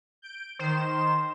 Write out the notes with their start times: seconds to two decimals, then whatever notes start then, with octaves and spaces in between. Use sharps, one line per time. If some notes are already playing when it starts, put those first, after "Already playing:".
0.22 G6 D7
0.59 D#3 C5 E7